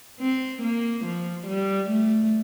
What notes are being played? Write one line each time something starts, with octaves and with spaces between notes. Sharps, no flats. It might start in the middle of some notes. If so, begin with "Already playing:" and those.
C4
A#3
F3
G3
A3